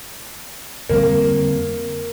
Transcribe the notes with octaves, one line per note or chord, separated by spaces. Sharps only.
F2 D3 G3 A#3 C4